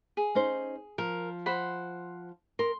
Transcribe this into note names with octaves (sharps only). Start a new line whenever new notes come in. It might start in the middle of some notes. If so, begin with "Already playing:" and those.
G#4
C#4 D#4 C5
F3 A#4
C5 F#5 B5
A#4 C6